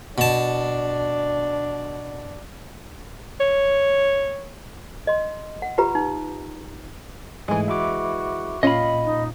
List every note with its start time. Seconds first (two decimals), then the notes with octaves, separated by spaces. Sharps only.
0.18 B2 D4 A5
3.40 C#5
5.07 D#5 C6
5.62 F#5
5.78 F4 G4 B4 A#5 B5
5.95 D#4
7.48 G#2 E3 G#3 A3 G#5
7.68 F#4 E5 B5 D6
8.63 A#2 C#4 F4 D#5 F5 B5
9.04 D#4